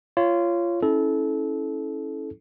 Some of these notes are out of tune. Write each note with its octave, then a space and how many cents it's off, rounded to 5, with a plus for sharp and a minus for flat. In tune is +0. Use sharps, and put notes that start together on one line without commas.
F4 -20 C#5 +0
C#4 -10 E4 -25 A4 -25